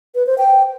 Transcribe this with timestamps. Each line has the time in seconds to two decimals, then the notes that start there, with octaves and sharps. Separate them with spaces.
0.15 B4
0.27 C5
0.38 G5